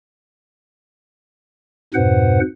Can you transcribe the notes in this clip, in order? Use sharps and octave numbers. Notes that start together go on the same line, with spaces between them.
F2 G#2 B2 B4 C5 F#5